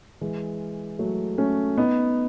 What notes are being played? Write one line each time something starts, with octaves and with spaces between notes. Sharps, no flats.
E3 G#3
F#3 A3
A3 C#4
B3 D#4